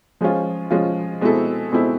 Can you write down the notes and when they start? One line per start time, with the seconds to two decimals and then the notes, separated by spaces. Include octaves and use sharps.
0.21 F3 G#3 C#4 F4
0.71 F3 G#3 C#4 F4
1.21 B2 G#3 C4 E4 A4
1.71 B2 G#3 C4 E4 A4